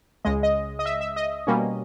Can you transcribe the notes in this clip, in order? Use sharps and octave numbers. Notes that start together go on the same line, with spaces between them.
C#2 C#3 G#3 D#5
D#5
D#5
E5
E5
D#5
B2 G3 A#3 C#4